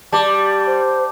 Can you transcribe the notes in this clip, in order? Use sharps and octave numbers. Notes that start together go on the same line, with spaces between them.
G3 D5 A5 D6
C5